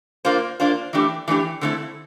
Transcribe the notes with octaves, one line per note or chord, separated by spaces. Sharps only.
A#3 D4 F4 C5
A#3 D4 F4 C5
E3 A3 D4 G4
E3 A3 D4 G4
D3 A3 C4 E4